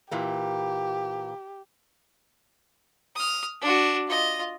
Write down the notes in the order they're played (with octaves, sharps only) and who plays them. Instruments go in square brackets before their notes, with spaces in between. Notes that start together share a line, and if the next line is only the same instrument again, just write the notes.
[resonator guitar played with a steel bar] A#2 E3 A#3 [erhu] G4
[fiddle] D#6 F6
D4 F#4
F4 D#5